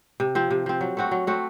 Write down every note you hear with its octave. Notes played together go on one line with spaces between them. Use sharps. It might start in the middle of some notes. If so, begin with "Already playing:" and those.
C3
F3 C4
C3
F3 C4
F#3
A3 C4 F#4
F#3
A3 C4 F#4